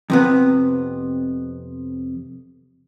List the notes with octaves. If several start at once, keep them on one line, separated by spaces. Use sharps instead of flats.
F2 C3 B3